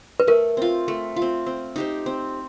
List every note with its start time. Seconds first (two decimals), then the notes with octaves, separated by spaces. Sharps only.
0.20 B4
0.27 A3 A#4
0.57 C4 F4
0.88 A3
1.16 F4
1.22 C4
1.46 C4
1.76 D#4 G4 C5
2.06 C4